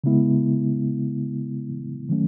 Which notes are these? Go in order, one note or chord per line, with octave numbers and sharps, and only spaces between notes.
C#3 G#3 B3 E4
D#3 F#3 A3 C#4